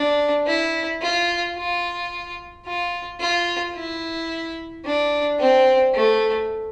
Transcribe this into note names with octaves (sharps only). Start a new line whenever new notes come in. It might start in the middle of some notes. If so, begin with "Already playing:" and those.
Already playing: D4
E4
F4
F4
F4
F4
E4
D4
C4
A3